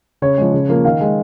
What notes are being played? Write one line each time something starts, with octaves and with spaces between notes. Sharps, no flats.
C#3 C#5
F3 G#3
C#3
F3 A#3
D#3 F5
G#3